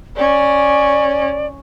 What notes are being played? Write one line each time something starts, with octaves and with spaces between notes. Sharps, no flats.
C#4 D5